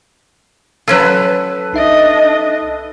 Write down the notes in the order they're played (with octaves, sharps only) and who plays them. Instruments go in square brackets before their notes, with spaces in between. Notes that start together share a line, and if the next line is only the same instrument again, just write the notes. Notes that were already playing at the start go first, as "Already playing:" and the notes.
[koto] F#3 C#4 F4 [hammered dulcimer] A4 B4
[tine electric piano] C2 D#4 E5 [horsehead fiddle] D4 D#5